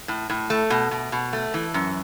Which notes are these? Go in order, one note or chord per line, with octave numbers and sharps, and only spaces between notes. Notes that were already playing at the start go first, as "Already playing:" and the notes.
A2
A2
A3
B2
B2
B2
A3
E3
F#2